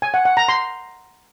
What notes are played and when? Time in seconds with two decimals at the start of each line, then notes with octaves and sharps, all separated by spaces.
0.02 G#5
0.14 F#5
0.25 F#5
0.37 A#5
0.49 C6